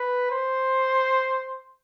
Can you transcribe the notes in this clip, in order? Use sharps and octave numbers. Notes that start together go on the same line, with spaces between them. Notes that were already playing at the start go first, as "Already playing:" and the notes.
Already playing: B4
C5